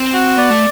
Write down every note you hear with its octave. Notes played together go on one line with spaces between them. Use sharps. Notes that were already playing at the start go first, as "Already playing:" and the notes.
Already playing: C4
F#4
B3 D5
A3